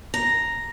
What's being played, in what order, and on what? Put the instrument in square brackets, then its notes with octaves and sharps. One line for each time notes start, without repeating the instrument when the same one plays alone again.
[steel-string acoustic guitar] A#5